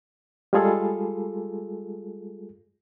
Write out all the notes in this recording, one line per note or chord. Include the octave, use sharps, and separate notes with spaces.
G3 G#3 F4 G#4 A4